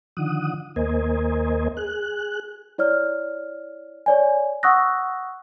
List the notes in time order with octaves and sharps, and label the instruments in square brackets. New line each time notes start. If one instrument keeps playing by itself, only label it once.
[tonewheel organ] D3 D#3 F3 F#5 D#6
D#2 A#3 A#4 C5 D#5 G#5
G#4 F#6
[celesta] E4 C#5 D5 F6
C#5 D5 G#5
F#5 C#6 D#6 E6 F#6 A#6